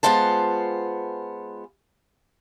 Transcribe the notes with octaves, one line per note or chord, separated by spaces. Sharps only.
G#3 B3 F4 C5 A5